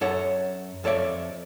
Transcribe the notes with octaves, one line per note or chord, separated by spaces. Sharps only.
F#2 A4 C#5 F#5
F2 A4 C#5 D5 E5